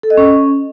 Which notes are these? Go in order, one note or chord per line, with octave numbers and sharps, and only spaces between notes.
A4
D#5
C#4